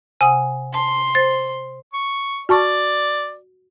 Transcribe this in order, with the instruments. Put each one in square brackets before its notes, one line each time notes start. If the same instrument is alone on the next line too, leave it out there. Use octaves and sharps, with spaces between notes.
[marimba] C3 F#5 D#6 [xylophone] G#5
[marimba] A5 [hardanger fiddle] C6
[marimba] C5 [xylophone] A6
[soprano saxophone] C#6
[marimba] F#4 A5 C#6 [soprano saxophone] D5